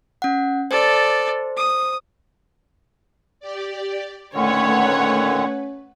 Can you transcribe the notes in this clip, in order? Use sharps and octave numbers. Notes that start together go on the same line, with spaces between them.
C#4 F#5
A4 C5 D5
D#6
G4 D5
A#2 D3 D#3 A3 C#4 B4 C#5 F#5